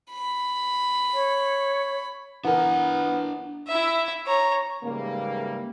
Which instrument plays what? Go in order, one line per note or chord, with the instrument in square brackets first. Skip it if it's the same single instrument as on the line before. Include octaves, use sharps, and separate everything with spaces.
[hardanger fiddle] B5
[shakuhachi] C#5
[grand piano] E3 A#4 [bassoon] B3 [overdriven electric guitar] D4 A#5
[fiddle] E4 E5
C#5 A#5
[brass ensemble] G#2 C#3 E3 G3 A3 A#3